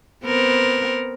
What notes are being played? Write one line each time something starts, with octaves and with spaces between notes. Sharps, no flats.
B3 C4 A#4